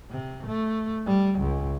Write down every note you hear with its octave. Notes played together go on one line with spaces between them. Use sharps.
C3
A3
G3
C#2